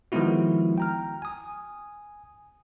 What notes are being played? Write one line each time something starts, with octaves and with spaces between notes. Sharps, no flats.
D#3 F3 G#3 B3 E4 F#4
G5 A#5 F6
G#5 D#6